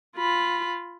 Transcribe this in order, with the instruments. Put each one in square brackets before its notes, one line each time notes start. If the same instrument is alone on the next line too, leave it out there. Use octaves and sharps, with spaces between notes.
[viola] F4 B5